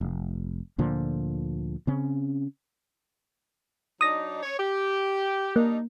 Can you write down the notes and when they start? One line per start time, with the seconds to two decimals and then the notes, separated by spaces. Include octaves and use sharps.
0.01 F1
0.78 D2 A#2 D3 F3
1.87 C#3 C4 C#4
4.01 F#3 D4 D#4 D#6 A#6
4.43 C#5
4.59 G4
5.56 G3 A#3 D4 D#4